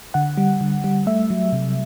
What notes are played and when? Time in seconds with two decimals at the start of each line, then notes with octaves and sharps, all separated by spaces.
0.14 D3 F#5
0.38 G3
0.61 D3
0.84 G3
1.07 A3 E5
1.30 F#3
1.53 C3